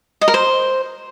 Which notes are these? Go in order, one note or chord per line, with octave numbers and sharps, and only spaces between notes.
D#5
A#4
C5